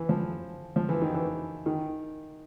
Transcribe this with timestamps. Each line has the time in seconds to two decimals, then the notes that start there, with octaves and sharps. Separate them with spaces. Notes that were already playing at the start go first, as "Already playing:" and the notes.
Already playing: E3
0.09 F3
0.76 F3
0.89 E3
1.02 D#3
1.14 E3
1.66 D#3